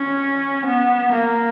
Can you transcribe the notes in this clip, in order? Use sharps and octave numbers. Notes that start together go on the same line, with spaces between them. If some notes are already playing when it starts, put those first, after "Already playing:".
Already playing: C#4
B3
A#3